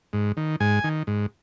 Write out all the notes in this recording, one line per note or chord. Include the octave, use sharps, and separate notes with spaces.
G#2
D#3
G#2 G#5
D#3
G#2